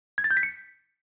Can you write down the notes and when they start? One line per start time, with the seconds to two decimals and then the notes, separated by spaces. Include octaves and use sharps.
0.18 G#6
0.24 A6
0.31 G6
0.37 B6
0.43 C#7